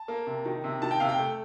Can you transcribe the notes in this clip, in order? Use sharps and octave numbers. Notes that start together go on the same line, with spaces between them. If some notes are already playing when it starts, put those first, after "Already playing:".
Already playing: A5
A#3
C3
D#3
C3
D#3 A5
G5
C3 F5
G5
A3